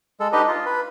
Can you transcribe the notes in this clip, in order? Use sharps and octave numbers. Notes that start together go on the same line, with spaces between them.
G#3 A4
D4 D#4 G4 B4 D#5
F4
B4